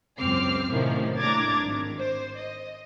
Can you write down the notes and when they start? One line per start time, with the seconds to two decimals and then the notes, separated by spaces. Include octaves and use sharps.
0.18 C#2 F#2 C4 D6 F6 C7
0.70 A2 C3 D#3 F3 C#4 E4
1.17 A2 D4 A#5 D6 G#6 A6
1.62 G#1 D#3
1.99 C5
2.37 D#5